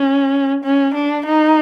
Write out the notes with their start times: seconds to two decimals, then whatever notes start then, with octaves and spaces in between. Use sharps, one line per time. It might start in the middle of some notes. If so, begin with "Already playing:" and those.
Already playing: C#4
0.64 C#4
0.95 D4
1.26 D#4